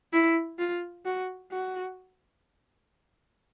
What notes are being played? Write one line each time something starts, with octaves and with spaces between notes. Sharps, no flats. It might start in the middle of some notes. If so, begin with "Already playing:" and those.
E4
F4
F#4
F#4